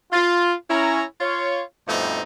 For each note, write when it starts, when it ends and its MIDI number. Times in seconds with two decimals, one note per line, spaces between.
0.12 0.53 65
0.69 1.03 61
0.69 1.03 64
0.69 1.03 82
1.21 1.61 65
1.21 1.61 73
1.88 2.21 43
1.88 2.21 47
1.88 2.21 53
1.88 2.21 57
1.88 2.21 60
1.88 2.21 63